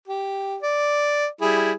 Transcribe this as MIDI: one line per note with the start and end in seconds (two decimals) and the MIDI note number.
0.08 0.57 67
0.62 1.27 74
1.41 1.72 55
1.41 1.72 64
1.41 1.72 68